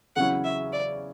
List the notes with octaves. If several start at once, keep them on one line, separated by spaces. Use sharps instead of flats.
E2 C#3 F#3 C#4 E4 F#5
E5
D5